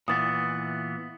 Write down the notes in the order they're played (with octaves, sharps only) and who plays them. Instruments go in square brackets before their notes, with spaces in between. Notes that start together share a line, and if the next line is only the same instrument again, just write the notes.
[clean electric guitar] A#2 E3 B3 [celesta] D#6 A6